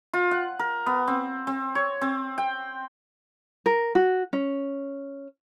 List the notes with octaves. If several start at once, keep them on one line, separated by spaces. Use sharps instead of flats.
F4
F#5
A#4
B3
C4
C4
C#5
C4
G5
A#4
F#4
C#4